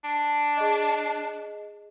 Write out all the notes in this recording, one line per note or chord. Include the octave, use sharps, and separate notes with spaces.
D4
G#4 D#5